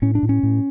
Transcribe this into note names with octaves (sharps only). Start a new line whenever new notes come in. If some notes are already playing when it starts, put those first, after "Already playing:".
A2 C#4
D4
A2
C#4
A2